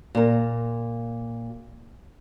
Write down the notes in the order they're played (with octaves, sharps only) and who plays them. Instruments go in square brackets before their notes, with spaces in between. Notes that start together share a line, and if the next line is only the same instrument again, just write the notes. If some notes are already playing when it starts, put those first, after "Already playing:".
[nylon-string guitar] A#2 A#4